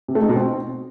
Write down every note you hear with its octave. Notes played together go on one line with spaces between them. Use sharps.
C3
A3
D#4
B2
C4